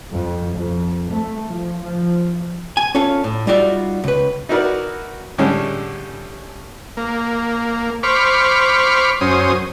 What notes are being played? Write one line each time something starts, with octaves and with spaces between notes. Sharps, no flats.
F2
F2
A3
F3
F3
G#5
C#4 F4 A4 F5
A2
G3 D#4 F4 F#4 D5 E5
C#2 B4
D#4 E4 F#4 A#4 B4 D5
A2 D3 G3 G#3 C#4
A#3
C5 B5 C#6 D6 F6
F#2 C#4 C5 D#6